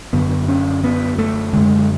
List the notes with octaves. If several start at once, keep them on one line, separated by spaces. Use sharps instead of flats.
F#2 D3 B3
C#4
B3
A3
F#2 D3 G#3